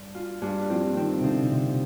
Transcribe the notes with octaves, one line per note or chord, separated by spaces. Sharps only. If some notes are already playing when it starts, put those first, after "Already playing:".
Already playing: G2
F4
G2
F3 C4
D#3 C4
C3
D3 F3
C3 C4